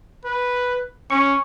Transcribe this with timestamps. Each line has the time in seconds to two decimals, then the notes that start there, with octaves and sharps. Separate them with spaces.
0.25 B4
1.10 C#4 C#6